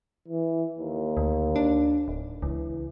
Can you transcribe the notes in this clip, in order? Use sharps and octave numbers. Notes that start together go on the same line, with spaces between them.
E3
D#2
D2
D4
D1
C#2 E3